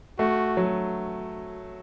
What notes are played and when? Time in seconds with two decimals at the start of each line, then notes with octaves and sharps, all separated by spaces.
0.19 A3 F#4
0.57 F#3